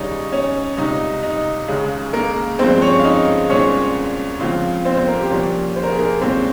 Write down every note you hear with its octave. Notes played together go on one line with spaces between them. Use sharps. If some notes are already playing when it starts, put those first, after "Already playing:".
Already playing: D#2 C#3 G3 C#4 D#4 D#5
C#4 C#5
C#2 C3 G3 D#4 D#5
D#4 D#5
D#2 C#3 G#3
A#3 A#4
G2 F3 G#3 C4 C5
C#4 C#5
F5
D#4 D#5
C2 A#2 G#3 C4 C#4 C#5
C#2 C#3 F3 C4 F4
C4 C5
C4 C5
A#3 A#4
G4
C2 A#2 F3 A#3 C#4
C5
A#4
G#4
A#3 A#4
C2 A#2 G#3 C4 C#4 C5